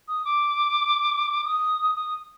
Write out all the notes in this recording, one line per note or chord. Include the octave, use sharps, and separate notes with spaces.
D#6
D6
D#6
D#6